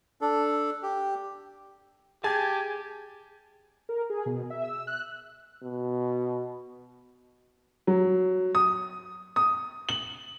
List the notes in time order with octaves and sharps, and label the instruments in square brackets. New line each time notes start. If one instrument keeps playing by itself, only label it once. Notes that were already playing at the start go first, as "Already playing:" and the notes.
[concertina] D4 A4
G4
[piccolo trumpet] G4 [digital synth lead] G#4 [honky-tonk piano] G#5 G#6 [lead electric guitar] A5
[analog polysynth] A#4
G#4
B2
E5
E6
F#6
[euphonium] B2
[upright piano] F#3
D#6
D#6
F#7